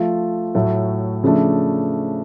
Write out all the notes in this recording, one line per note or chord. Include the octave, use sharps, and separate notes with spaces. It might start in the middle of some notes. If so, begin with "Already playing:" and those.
Already playing: F3 A3 F4
A2 F#3 A3
C#3 F3 A3 D4